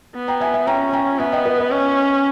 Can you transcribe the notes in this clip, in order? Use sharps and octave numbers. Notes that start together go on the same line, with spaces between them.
B3
G5 A#5
E5 G#5
E5 G#5
C#4 G5 A#5
G5 A#5
B3 E5 G#5
D#5 G5
B4 D#5
B4 D#5
C#4